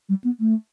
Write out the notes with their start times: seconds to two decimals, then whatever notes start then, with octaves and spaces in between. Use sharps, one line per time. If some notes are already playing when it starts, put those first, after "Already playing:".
0.09 G3
0.24 B3
0.40 A3